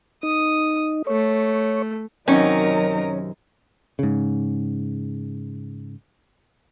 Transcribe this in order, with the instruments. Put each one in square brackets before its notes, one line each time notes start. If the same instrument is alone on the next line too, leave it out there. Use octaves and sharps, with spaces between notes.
[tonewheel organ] D#4 [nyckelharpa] D#6
[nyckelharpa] A3 [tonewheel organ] C#5
[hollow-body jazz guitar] F#2 C3 D#3 [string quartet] F#3 D#4 A#4 [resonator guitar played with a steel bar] C#4
[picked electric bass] G#2 C#3